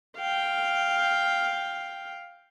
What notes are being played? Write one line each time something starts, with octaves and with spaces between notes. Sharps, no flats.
F5 G5